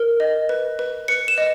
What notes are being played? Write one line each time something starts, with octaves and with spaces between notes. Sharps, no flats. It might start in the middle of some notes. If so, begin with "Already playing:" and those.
Already playing: A#4
D#5
B4
B4
B4 C#7
E7
D#5